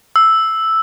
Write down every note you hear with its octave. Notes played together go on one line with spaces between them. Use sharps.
E6